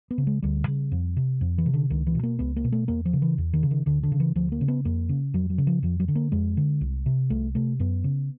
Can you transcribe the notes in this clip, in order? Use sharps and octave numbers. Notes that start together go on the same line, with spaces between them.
B3
C#3
G#3
D2 G3
C#3
F2
C3
F2
E3
C3
D3
C#2 D#3
E3
B2
A#3
C#2 B3
A#3
B2
A3
E2 A#3
F3
C#3
E3
E2
D#3
C#3
D#3
D2 D3
D3
C#3
E3
D2 F3
A#3
C#3
B3
F2 A#3
C#3
F2 F#3
F#3
C#3
F3
F2 F3
F#3
D3
A#3
F2 G#3
D3
C2
C3
C2 A3
C3 A3
F#2 B3
C#3